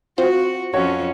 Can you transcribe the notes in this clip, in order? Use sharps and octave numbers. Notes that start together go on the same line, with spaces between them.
C4 F4 F#4 C5
F2 F3 C#4 F#4 C#5